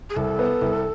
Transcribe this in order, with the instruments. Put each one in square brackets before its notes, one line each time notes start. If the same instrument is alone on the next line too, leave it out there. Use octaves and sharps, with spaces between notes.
[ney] G#4
[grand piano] C2 [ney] A4
[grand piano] B3
C2